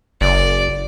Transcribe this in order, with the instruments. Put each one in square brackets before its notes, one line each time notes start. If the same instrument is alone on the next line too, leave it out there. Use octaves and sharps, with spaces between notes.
[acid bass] F#1 [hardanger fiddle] D5